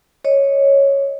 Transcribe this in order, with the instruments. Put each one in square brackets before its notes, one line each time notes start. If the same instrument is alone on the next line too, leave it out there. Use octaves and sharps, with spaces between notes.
[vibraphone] C#5 D#5